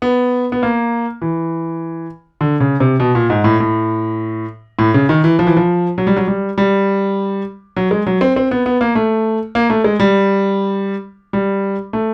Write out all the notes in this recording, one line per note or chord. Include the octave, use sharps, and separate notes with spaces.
B3
B3
A#3
E3
D3
C#3
C3
B2
A#2
G#2
A2
A2
A2
C#3
D#3
E3
F3
E3
F3
F#3
G3
F#3
G3
G3
F#3
G#3
F#3
C4
C4
B3
B3
A#3
A3
A#3
A3
G#3
G3
G3
A3